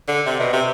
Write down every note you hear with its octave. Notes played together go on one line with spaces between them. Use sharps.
D3
C3
B2
C3